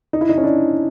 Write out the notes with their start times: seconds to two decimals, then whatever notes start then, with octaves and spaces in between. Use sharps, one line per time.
0.13 D#4
0.21 E4
0.29 D#4
0.38 C#4
0.44 D4